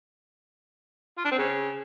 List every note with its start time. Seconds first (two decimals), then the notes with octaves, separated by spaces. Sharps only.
1.18 F4
1.24 D4
1.31 C4
1.38 C#3